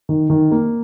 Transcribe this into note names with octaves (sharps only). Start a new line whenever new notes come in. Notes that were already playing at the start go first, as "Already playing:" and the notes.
D#3
D#3
A#3